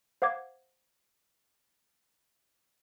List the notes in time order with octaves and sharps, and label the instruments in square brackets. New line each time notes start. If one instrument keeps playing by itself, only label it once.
[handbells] C5 F5 F#5 D6 G#6